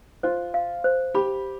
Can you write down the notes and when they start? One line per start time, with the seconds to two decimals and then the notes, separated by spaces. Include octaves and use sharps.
0.23 F4 C5
0.54 F5
0.84 C5
1.15 G4 B5